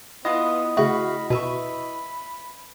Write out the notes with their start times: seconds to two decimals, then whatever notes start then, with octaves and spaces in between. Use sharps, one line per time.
0.25 B3 E4 F4 B4 D#5 F#5 D#6
0.77 C#3 A3 F#4 F5 B5
1.30 B2 B4 E5 B5 C#6